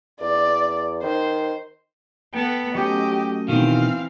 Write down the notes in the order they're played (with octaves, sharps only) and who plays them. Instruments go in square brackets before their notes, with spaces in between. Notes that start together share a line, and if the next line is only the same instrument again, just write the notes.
[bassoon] E2 [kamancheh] D5
[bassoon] D#3 [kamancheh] C5
[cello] B3 A4 [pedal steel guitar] G5
[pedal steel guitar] F#3 A3 C#4 [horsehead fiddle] G4 [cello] D#5
[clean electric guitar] B2 D#3 [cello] E3 C4 [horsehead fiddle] F5